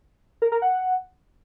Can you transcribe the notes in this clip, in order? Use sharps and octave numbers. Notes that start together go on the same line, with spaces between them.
A#4
A#4
F#5